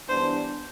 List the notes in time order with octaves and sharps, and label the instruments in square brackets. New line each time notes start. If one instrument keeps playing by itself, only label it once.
[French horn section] G2 E3 B3 D4 [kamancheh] C5